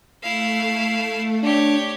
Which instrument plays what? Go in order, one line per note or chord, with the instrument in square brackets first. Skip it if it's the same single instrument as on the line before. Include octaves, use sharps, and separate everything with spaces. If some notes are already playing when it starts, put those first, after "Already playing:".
[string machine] A3 [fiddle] E4 F5
[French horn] D4 [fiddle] G4 C#5